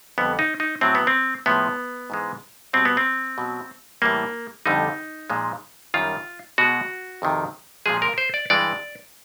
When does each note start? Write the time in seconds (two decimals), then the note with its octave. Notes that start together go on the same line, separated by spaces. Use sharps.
0.18 F2 D3 G3 B3
0.39 D#4
0.60 D#4
0.81 A2 F#3 C4
0.95 B3
1.07 C4
1.46 A2 F3 G#3 B3
2.10 G#2 E3 G#3
2.73 B2 G3 C4
2.85 B3
2.97 C4
3.38 B2 F#3
4.02 A2 E3 G3 A#3
4.66 F2 D3 G3 D#4
5.30 A#2 F3 G#3
5.94 F#2 D#3 G3 F4
6.58 B2 G#3 F#4
7.22 F2 C3 D#3
7.86 A#2 F3 G#3 G#4
8.02 A#4
8.18 C5
8.34 D5
8.50 G2 E3 G#3 D5